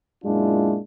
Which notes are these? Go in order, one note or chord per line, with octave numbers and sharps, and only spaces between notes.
F#2 A#2 G#3 D4 E4 F4